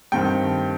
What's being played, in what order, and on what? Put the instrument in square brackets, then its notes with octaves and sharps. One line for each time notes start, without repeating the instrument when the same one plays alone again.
[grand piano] G2 D#3 A3 C4 G5